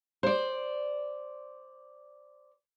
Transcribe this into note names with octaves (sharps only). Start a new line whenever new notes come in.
C5 D5